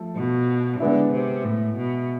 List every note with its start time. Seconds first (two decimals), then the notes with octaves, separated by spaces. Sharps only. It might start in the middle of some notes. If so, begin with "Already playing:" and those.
Already playing: F3 A3 A4
0.16 B2
0.80 D3 G#3 B3 E4
1.13 C3
1.44 A2
1.77 B2